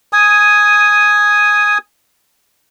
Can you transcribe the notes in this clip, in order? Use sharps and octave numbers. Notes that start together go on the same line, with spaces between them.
G#5 D#6